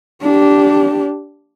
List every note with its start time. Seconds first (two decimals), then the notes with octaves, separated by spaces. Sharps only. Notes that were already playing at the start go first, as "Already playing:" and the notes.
0.22 D4 G4